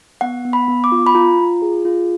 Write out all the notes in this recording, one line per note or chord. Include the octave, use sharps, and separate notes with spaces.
B3 F#5
B3
B5
B3
D6
F4
B5
F4 A#5
F4
G#4
F4